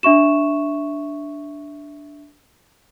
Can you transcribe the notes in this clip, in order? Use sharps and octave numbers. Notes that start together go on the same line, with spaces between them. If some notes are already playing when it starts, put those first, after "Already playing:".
D4 E5 C#6 E7